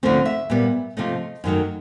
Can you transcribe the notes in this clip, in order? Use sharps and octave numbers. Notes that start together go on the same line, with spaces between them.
D2 D3 F3 A3 C4
E5
A#2 G3 B3
C3 F3 A3 D#5
F#2 D#3 F#3 A3